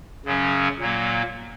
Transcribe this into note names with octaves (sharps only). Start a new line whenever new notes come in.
F#2 C#3 F#3 C#4
A#2 F#3 A#3